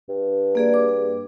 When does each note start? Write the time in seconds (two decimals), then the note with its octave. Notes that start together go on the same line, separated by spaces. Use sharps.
0.09 G2
0.55 A#3 G#4 D5
0.74 D6